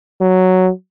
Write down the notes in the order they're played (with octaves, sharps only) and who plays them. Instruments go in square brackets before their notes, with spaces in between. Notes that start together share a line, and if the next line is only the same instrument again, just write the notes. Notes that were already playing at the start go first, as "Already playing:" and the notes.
[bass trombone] F#3